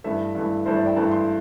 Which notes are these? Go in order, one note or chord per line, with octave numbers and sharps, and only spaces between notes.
G2 E3 A3 E5
G2 E3 A3
G2 E3 A3 C5
D5
G5
G2 E3 A3 A5
C6